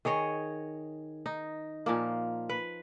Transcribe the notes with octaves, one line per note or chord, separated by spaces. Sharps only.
D#3 G#4 C#5 D#5
D#4
A#2 F3 A#3
B4